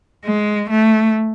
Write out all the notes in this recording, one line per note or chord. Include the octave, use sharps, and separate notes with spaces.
G#3
A3